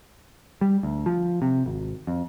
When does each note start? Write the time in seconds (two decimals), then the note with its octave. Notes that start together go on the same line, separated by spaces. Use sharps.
0.61 G3
0.83 D2
1.06 F3
1.42 C3
1.66 G#1
2.07 F2